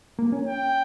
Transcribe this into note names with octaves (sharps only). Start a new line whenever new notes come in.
A#3
C#4
G5